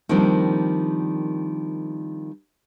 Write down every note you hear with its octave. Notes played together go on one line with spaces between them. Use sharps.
D#3 F3 G3 A#3 C4 D4